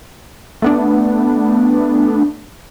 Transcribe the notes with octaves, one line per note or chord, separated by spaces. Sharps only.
A3 B3 D4